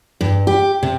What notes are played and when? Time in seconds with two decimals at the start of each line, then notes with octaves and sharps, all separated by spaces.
0.21 G2
0.47 G4
0.83 C3